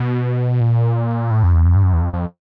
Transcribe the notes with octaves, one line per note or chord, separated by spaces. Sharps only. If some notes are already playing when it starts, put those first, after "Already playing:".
Already playing: B2
A#2
A2
F2
E2
F2
G2
F#2
E2
F2
F2